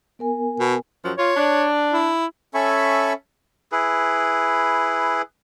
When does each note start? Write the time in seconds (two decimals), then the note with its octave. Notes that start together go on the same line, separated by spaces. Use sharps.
0.19 B3 A#4 G#5
0.60 B2
1.04 F#2 F3 F#3
1.18 F4 C#5
1.37 D4
1.93 E4
2.54 C#4 A4 E5 G#5 B5 C#6
3.72 E4 G#4 B4